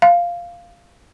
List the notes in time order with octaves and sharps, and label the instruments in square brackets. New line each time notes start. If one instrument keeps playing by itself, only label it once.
[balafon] F5